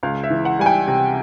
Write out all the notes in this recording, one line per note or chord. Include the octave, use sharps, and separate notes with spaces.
C#2 F5
E5
E3
F#5
G3 G#5
G5
C3